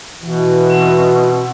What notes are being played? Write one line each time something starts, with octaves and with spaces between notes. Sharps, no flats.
B2 E3 F#4
C4 F#5 E6